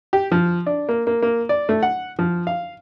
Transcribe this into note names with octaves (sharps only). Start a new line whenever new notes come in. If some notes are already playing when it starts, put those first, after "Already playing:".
G4
F3
D4
A#3
A#3
A#3
D5
A3
F#5
F3
F5